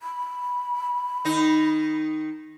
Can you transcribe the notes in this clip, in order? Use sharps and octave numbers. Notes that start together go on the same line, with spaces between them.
B5
D#3 D#4